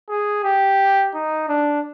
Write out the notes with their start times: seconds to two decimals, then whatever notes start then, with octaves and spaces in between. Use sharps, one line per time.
0.09 G#4
0.44 G4
1.14 D#4
1.48 D4